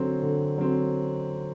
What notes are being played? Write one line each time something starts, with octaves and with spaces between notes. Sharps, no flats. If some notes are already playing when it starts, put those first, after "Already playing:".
Already playing: D3 F#3 C4
D3
F#3 C4